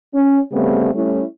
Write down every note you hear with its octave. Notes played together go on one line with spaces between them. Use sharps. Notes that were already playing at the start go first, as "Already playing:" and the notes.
C#4
C#3 G3 A3 B3 C4
G3 A3 C#4 E4